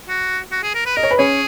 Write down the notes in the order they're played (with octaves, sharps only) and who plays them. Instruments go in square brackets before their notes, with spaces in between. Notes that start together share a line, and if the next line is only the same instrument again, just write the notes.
[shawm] F#4
F#4
G#4
A#4
B4
[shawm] A#4 [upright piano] D#5
[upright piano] C#5
B4
[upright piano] C#4 C#5 [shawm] G#4